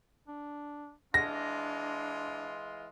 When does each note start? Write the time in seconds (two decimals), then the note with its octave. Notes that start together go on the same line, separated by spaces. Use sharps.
0.28 D4
1.14 E3 G#3 D4 F4 A#6